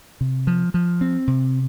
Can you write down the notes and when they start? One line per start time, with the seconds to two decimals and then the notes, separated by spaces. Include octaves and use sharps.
0.21 C3
0.47 F3
0.74 F3
1.01 C4
1.27 C3